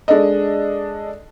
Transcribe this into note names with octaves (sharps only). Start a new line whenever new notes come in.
G#3 D4 A4 D#5